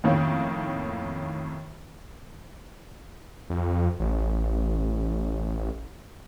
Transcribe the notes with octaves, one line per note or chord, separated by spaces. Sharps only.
F2 A2 D#3 A#3 C#4
F2
A1